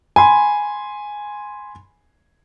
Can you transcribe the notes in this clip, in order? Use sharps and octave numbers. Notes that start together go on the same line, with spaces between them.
G#5 B5 C6